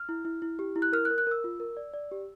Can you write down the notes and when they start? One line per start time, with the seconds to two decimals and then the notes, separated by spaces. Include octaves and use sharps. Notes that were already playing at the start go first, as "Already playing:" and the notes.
Already playing: F6
0.09 E4
0.25 E4
0.42 E4
0.59 G4
0.76 E4
0.82 F#6
0.93 A#4 F6
1.05 F#6
1.10 A#4
1.18 F#6
1.27 A#4 E6
1.44 F4
1.60 A#4
1.77 D5
1.94 D5
2.12 G4